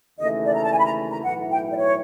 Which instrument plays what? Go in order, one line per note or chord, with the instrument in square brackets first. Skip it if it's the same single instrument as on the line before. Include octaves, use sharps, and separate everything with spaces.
[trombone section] D#2 C#3 E3 A3 [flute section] D#5
[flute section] D5
A#5
A5
G#5
B5
A#5
A#5
[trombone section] B1 A2 E3 [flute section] F#5
[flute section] G5
D5
C#5